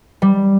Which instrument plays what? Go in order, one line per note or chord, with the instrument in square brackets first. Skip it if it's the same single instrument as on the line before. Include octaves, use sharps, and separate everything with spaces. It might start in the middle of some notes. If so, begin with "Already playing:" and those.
[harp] G3